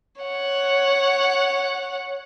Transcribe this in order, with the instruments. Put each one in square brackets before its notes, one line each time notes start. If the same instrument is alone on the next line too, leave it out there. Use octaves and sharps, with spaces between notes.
[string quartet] C#5 F#5